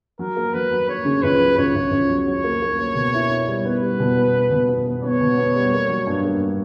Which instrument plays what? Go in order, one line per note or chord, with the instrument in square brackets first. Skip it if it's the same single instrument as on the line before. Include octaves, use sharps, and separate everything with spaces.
[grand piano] F#3 [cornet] A#4
[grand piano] A#3
[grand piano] F#3 [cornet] B4
[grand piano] F#3
[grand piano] A#3 [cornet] C#5
[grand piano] C#3
[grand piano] C#2 [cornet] B4
[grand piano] F#3
[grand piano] C#2 [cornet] C#5
[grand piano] C#2
C#2
F#3
[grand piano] F#3 [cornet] C#5
[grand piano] A#3
A#3
A#3
B2
E4
E4
G3
[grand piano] B3 [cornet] B4
[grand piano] G3
B2
B3
B3
B2
B3
B3
[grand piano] B3 [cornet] C#5
[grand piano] B2
B3
G3
A#3
F#3
G2
A#3